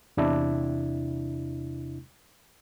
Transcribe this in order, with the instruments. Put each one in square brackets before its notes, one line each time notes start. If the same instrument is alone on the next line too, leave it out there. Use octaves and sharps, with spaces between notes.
[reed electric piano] E2 C3 D4 E4